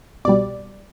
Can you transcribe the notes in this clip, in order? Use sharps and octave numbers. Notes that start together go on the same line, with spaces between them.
C2 B2 G3 D5